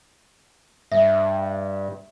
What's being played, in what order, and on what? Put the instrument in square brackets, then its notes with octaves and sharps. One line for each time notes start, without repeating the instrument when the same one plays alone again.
[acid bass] G2 [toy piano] E5